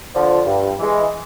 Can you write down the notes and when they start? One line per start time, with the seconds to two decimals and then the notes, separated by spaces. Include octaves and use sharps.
0.14 D3 F3
0.46 G2
0.78 E3 G#3